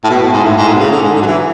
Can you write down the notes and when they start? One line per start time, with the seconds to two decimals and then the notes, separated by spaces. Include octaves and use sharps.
0.04 A2
0.10 B2
0.21 A2
0.33 G#2
0.45 A2
0.57 G#2
0.68 A2
0.75 B2
0.79 C#3
0.92 D3
1.03 G#2
1.15 D3
1.22 F#3
1.26 E3